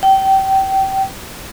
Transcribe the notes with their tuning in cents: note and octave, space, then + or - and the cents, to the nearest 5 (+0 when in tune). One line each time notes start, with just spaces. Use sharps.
G5 -25